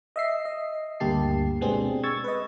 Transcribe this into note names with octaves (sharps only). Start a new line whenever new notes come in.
D#5 E5 C7
D#5
D2 G2 A#3 G4 A5 C7
B2 G#3 B3 C4 D4 G#4
C#6 E6 G#6 A6
B4 D#5